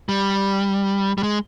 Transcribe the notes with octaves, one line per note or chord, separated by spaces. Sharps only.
G3
G3
G#3